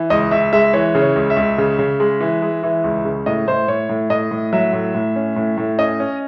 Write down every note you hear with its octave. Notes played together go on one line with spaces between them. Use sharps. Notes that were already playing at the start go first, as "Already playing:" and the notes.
Already playing: E3
C#2 D#5
C#2 E5
G#3 E5
E3 C#5
C#3
C#5
C#2
E5
C#2
C#3
C#3
G#3
E3
G#3
E3
C#2
C#3
A2 D#5
A2 C5
A2 C#5
A2
A2 D#5
A2
F#3 E5
A2
A2
C#4
A2
A2
C#4 D#5
C#4